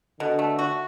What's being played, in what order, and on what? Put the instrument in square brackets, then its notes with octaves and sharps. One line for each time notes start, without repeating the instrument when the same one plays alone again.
[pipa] B2 [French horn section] D3
[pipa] A3
F#4